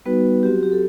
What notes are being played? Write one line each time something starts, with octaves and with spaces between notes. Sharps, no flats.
G3 B3 D#4 F#4 B4
F#3 C4 F#4 G4
G4
A4